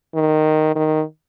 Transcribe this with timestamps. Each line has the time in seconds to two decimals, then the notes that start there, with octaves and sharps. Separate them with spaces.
0.15 D#3
0.76 D#3